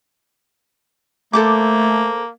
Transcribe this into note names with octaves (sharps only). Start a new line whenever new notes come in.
A3 A#3 A4 C5 D6